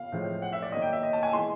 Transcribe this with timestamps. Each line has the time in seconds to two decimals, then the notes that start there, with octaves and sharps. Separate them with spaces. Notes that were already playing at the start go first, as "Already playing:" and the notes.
Already playing: F5
0.12 A2 F3 G#3 C4
0.42 F#5
0.53 E5
0.62 D5
0.72 D#3 F#3 A#3 D#5
0.82 G5
0.93 E5
1.03 D#5
1.13 A5
1.23 G#5
1.33 E3 G#3 B3 C6